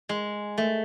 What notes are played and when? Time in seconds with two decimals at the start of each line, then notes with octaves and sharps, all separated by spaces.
0.09 G#3
0.58 A3